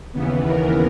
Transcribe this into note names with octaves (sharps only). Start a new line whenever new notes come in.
D#2 C#3 E3 B3
A#4